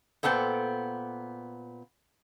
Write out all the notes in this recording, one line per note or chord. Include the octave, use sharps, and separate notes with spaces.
A#2 B3 A4 C5 G5